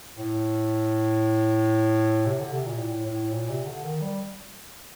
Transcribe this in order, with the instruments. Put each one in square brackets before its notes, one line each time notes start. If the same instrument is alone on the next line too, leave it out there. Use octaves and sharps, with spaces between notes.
[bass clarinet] A2
C3
D3
C3
A#2
A2
A2
A#2
C3
D3
D#3
G3